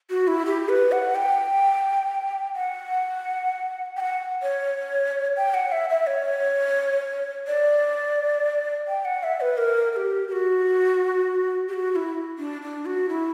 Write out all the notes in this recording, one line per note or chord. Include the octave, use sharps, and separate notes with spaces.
F#4
E4
G4
B4
F#5
G5
F#5
G5
F#5
C#5
G5
F#5
E5
E5
C#5
D5
G5
F#5
E5
B4
A#4
A#4
G4
G4
F#4
G4
F#4
F#4
E4
D4
D4
F#4
E4